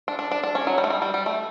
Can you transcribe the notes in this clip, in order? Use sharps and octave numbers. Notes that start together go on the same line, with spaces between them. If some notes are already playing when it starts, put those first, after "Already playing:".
D4
D4
D4
D4
C#4
F#3
G3
A3
G3
G3
G3
A3